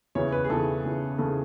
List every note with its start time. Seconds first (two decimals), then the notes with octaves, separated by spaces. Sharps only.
0.15 E2 C#3 E3 C#5
0.32 B4
0.45 G#4
0.50 E2 C#3 E3 A4
0.84 E2 C#3 E3
1.18 E2 C#3 E3 A4